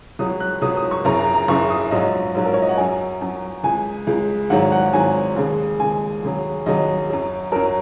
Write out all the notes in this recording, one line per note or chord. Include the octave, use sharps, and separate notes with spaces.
C#2 C#3 F#3 D#6
F#6
C#2 C#3 F#3 D#6
D#6
C#6
F#1 F#2 C#3 A#5
A#5
A#5
F#1 F#2 C#3 C#6
D#6
A#1 G#2 F#3 D#5
A#1 G#2 F#3
A#4
C#5
D#5
F#5
F#2 F#3 G#5
F#2 F#3
C#2 C#3 G#3 G#5
C#2 C#3 G#3
G#1 G#2 F#3 F#5
F#5
G#1 G#2 F#3 G#5
D#2 C#3 G#3
D#2 C#3 G#3 G#5
D#2 C#3 F#3
D#2 C#3 F#3 D#5
F#2 F#3
F#2 F#3 A#4